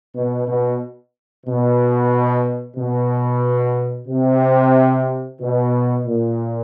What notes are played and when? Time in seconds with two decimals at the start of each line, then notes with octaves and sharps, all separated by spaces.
0.14 B2
0.47 B2
1.46 B2
2.77 B2
4.08 C3
5.40 B2
6.05 A#2